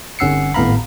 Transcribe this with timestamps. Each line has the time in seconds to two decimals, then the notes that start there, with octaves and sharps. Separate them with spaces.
0.19 G1 C#4 F#5 E6 C7 C#7
0.54 G#1 A2 B3 F5 A#5 B5